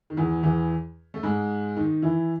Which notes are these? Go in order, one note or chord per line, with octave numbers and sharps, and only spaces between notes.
D#3
E2 E3
E2 E3
A3
G#2 G#3
D#3 D#4
E3 E4